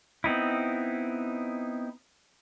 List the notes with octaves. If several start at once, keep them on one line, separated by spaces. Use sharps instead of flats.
B3 C4 D#4 E4